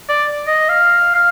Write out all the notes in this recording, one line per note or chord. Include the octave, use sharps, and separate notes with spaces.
D5
D#5
F5
F5